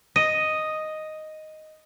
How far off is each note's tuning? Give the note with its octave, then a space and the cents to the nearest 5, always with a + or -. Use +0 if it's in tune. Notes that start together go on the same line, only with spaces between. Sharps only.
D#5 +0